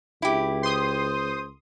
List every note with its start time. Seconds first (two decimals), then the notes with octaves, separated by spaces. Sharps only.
0.22 C#2 E4 G4
0.63 C5 C6 D#6